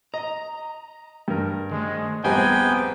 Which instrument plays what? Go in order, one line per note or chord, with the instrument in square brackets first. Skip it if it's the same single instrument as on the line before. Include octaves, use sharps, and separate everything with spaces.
[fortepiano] D#5 [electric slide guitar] A#5
[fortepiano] G2 A#4
[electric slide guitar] D#3 A3 [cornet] G#3
[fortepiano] A#1 G3 C4 [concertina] B3 G5 [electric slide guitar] G#4 C5 [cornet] G#5